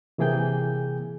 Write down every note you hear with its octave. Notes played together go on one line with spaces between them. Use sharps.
C3 E3 A#3 G#4 G5 G6